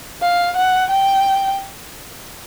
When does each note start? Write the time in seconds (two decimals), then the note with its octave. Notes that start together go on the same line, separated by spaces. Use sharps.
0.22 F5
0.57 F#5
0.90 G5